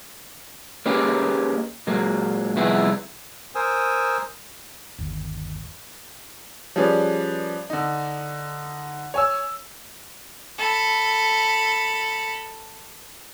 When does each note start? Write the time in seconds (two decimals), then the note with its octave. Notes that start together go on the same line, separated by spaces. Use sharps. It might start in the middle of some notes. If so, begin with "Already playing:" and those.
0.86 A#3 C#4 D#4 G4 G#4 B4
1.87 A#2 F#3 G#3 A#3
2.56 C2 F2 B3 E4 G#4
3.55 A#4 C5 G#5 D#6 E6
4.98 G1 D#2
6.76 F3 G3 C#4 G#4 B4 D5
7.70 D3 D#4
9.14 C#5 G#5 E6
10.58 A4 B5